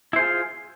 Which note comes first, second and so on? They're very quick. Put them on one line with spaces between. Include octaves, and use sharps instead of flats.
E4 C5 G#4 F4